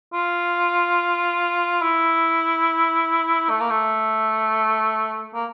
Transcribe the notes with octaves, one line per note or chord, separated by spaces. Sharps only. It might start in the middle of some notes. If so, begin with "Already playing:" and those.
F4
E4
A3
A#3
A3
A#3